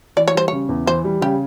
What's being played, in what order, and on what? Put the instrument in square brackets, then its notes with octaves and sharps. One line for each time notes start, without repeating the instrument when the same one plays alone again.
[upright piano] E3 [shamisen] D5
[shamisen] C#5
[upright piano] G3 [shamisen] C5
[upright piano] C#3 [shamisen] C#5
[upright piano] E2
[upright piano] E3 [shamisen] C5
[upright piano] G3
[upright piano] C#3 [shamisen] G4